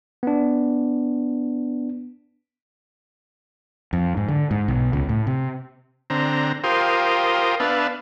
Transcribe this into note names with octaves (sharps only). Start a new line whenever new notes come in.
B3 D4
F2
G#2
D3
G#2
B1
C#2
A2
C3
D3 C4 A#5
F4 G4 A#4 C5 D#6
B3 D4 B4 E5 F5 A5